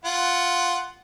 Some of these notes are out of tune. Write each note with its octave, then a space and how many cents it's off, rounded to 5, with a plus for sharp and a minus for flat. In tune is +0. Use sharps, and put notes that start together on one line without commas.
F4 +0 F#5 +0